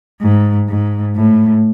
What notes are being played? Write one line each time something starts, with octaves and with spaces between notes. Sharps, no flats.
G#2
G#2
A2